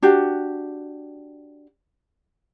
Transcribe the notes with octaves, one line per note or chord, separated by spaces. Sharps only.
D4 F#4 G4